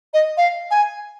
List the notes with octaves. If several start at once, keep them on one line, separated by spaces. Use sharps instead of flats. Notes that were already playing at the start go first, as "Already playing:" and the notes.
D#5
F5
G#5